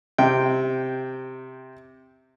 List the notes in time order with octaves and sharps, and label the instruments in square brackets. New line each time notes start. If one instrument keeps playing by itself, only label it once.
[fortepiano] C3 G5